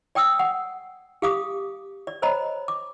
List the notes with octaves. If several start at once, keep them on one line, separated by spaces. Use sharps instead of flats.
D5 G5 D#6 E6
F#5
G4 F5 D6 D#6
D5
C5 C#5 D#5 A#5 B5
D6